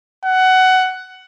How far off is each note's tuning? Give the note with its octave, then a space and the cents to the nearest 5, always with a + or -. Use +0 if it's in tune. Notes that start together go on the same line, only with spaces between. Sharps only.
F#5 +15